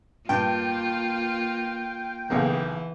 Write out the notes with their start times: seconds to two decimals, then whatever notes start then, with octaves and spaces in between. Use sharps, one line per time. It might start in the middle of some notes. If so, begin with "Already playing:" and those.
0.29 G2 A#3 F4 G5
2.30 B1 C#3 E3 A#3